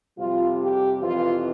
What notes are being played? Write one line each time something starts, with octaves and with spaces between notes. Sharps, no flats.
F2 C3 G3 F4
G4
F2 C3 E3 F4